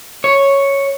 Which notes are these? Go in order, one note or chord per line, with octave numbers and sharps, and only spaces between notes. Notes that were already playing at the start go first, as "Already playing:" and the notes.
C#5